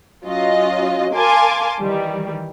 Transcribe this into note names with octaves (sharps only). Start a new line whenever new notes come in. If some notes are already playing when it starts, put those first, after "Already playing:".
F#3 C#4 F4 D#5
A#4 F5 G#5 A5 C6 D6
D#3 E3 G3